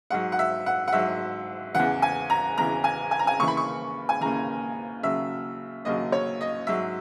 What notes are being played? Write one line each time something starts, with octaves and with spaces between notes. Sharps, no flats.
G#2 F#3 F#5
F#5
E5
F#5
F#5
G#2 F#3 E5
E2 C#3 E3 F#5
G#5
A#5
E2 C#3 E3 A#5
G#5
G#5
A#5
G#5
D#2 C#3 E3 C#6
B5
C#6
G#5
D#2 C#3 E3 A#5
D#2 C#3 F#3 E5
D#2 C#3 F#3 D#5
C#5
D#5
G#2 F#3 E5